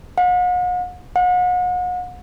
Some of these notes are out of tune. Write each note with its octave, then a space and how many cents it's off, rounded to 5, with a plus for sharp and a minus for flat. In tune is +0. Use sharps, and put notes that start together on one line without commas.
F#5 -45
F#5 -40